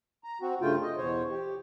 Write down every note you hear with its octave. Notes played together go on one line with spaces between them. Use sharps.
A#5
C4 F#4
G2 C#3 A3 F4 G5
D#5
E2 B2 C5 C#5
G4